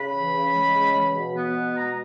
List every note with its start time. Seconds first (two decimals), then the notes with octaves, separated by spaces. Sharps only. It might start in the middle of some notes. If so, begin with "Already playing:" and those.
Already playing: C#3 B5
0.14 E3
0.34 C#3
0.54 G#3
0.74 C#3
0.94 E3
1.15 B2
1.35 B3
1.54 B2
1.75 G#3 A#5